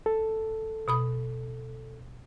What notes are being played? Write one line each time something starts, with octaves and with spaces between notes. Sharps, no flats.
A4
B2 B5 D#6